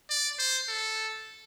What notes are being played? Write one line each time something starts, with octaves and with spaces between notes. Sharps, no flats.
D5
C5
A4